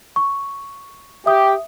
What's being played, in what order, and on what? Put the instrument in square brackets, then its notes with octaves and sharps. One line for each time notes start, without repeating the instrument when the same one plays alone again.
[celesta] C#6
[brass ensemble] G4 [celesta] E5 D#6